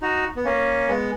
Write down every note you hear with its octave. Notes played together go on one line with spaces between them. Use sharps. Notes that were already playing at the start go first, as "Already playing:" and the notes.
D#4 F#4
B3
A#3 C#4
G#3 B3